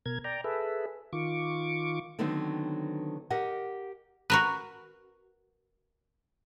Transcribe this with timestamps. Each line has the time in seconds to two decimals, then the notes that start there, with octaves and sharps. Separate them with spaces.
0.06 B2 A#4 G#6
0.24 D5 G5 A#5
0.44 G#4 A4 B4 E5
1.13 D#3 F4 C#6 D6
2.19 D3 D#3 F#3 B3 C4 D#4
3.30 G4 A#4 D#5 F#5
4.30 F#4 A#4 B4